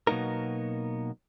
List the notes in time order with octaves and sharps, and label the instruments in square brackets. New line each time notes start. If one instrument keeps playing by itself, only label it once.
[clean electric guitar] B2 F#3 A#3 B3 D#4 A#4